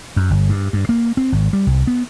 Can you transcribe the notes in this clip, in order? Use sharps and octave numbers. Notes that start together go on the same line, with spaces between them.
F#2
G1
G2
G2
A#3
C4
G#1
G3
C2
B3